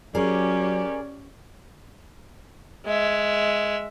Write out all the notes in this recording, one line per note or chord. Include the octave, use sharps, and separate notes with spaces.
F#3 C#4 G4 G#4 A#4 D5
G#3 E5